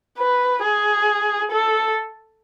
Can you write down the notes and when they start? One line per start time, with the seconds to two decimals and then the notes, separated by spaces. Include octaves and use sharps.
0.18 B4
0.63 G#4
1.51 A4